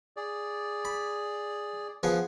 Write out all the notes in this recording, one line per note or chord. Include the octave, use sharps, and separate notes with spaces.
G#4 D5
B5
F3 B3 G#4